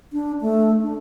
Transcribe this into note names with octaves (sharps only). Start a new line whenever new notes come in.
D4
A3
D4